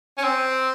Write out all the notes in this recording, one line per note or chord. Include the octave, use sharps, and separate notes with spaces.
C#4
C4